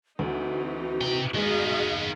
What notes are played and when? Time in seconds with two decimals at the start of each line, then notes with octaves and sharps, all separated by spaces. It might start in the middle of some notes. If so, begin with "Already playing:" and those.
0.19 D2 E3 C4 D#4 F#4
1.01 C3 G5
1.35 D#3 G#3 B3 G#4 D#5 F5